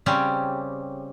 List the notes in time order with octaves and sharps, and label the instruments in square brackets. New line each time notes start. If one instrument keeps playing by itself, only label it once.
[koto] C#3 G3 C4 C#4 G4